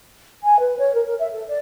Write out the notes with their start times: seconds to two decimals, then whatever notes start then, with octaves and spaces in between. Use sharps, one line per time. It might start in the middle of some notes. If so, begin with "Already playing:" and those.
0.44 G#5
0.59 B4
0.78 C#5
0.94 A#4
1.06 A#4
1.19 E5
1.32 A4
1.48 D5